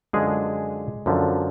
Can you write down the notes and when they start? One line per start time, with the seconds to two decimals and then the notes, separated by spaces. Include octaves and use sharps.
0.13 F#2 D3 F3 G#3 G#4
1.06 F#2 D3 F3